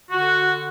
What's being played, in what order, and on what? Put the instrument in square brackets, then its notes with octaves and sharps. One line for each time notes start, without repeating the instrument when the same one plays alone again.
[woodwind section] D3 F#4